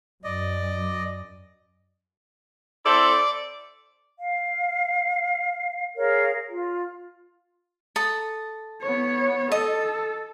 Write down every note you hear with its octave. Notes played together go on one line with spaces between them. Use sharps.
F#2 D5 D#5
C4 E4 A4 D5
F5
G#4 A#4 C#5 F5
F4
A4 D#6
B3 C#5
A4 D#5